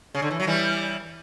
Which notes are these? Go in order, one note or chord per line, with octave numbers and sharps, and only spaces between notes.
C#3
D3
E3
F#3
E3 G3